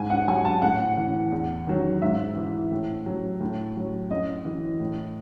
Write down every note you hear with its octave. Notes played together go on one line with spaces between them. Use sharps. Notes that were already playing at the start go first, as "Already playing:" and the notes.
Already playing: G#2 G#5
F#5
F#3 G#5
A5
A2 F#5
E3
E2
D#3 F#3
G#2 E5
E3
A2
F#3
A2
F#3
F#2 D#5
E3
A2